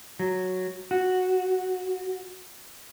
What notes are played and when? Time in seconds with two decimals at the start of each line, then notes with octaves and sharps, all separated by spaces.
0.19 F#3
0.91 F#4